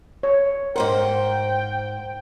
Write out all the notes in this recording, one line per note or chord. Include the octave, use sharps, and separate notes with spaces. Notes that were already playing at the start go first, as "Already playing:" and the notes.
C#5
G#2 A#4 C5 F#5 G5 C6